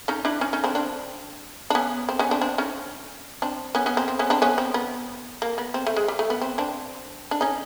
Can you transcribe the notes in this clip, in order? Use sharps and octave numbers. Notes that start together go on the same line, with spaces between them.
C#4 D#4
D4 E4
C#4 D#4
C#4 D#4
C4 D4
C4 D4
D4
B3 C#4
C4
B3 C#4
C4 D4
C4 D4
C#4 D#4
C4 D4
B3 C#4
B3 C#4
C4
C4
B3 C#4
C4 D4
B3 C#4
C4
B3
A#3
B3
C4
A3
G#3
G3
A3
B3
C4
C4 D4
D4
C#4 D#4